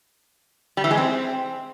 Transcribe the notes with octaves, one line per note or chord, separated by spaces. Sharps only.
G3
E3
G#3
C4